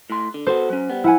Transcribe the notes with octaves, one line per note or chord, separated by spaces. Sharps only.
A2 C6
D3
B3 F#4 A4 C5
F#3 C#4
G3 B3
F3 E4 F#5 G#5